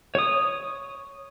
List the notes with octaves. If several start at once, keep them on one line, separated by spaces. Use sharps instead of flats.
C#5 D#6